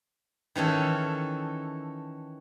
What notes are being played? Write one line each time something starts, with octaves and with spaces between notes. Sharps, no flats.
D#3 E3 C#4 A4